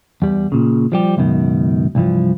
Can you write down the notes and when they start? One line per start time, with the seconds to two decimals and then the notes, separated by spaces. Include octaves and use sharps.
0.22 E2 G3
0.52 A#2 C#3
0.92 F3 G3 G4
1.17 C#2 F#2 B2 D#3
1.95 C2 G2 E3 F3